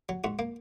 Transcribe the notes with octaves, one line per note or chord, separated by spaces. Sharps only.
F#3
G#2 F#4
A#3